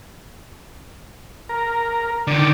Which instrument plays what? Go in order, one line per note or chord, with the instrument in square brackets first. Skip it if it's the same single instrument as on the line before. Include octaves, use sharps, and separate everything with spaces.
[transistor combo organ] A#4
[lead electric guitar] D3 D#3 [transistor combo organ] D5